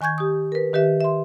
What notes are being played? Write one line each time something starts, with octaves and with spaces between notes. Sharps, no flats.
D#3 G#5 C#6 G6 G#6
G4 D#6
A#4 B4
D#3 G4 B4 E5
E5 C6